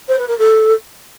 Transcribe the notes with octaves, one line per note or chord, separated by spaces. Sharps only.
C5
B4
A#4
A4